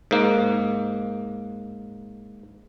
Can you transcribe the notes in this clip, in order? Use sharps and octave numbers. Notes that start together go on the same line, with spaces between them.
G#2 A#3